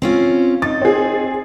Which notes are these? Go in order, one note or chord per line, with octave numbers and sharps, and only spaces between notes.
C4 C#4 F4
D#4 A6
C4 G#4